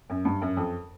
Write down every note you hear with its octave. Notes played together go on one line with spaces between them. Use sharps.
F#2
G2
F#2
F2